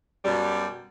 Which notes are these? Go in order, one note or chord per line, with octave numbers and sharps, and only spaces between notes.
F#2 B2 G3